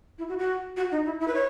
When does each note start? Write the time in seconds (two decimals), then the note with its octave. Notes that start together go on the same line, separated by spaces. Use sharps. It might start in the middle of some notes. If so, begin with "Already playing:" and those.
0.18 E4
0.29 F#4
0.39 F#4
0.76 F#4
0.91 D#4
1.06 E4
1.20 E4
1.28 B4
1.34 C#5